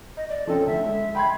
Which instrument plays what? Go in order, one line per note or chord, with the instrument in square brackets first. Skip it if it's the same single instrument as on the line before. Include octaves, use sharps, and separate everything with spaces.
[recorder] D#5
D5
[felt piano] F3 C4 C#4 [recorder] A4
[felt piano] D2 [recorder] E5
[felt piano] G#3
[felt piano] G5 C6 G#6 [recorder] B5